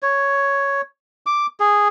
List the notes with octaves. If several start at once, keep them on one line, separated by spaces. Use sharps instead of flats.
C#5
D6
G#4